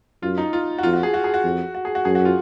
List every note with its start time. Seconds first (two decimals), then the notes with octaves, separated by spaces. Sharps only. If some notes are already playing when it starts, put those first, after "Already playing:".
0.23 F#2 F4
0.38 D#4
0.53 F4
0.78 F#4
0.83 F2 F4
0.93 F#4
1.03 G#4
1.14 F#4
1.24 G#4
1.34 F#4
1.44 F2
1.75 F#4
1.85 G#4
1.95 F#4
2.05 F#2 G#4
2.15 F#4
2.25 F4